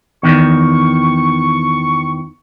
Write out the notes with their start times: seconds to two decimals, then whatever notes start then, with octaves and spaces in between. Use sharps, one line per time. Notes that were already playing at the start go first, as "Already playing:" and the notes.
0.23 E2 D#3 C#6